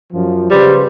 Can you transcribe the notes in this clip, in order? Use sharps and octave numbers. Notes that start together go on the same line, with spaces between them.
F#2 F3
C#3 G3 B4 C5